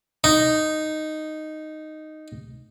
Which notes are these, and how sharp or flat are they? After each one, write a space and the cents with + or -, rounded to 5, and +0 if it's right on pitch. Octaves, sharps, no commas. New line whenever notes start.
D#4 -5